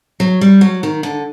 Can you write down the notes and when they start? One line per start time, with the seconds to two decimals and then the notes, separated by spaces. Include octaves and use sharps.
0.20 F#3
0.41 G3
0.61 F#3
0.83 D#3
1.03 D3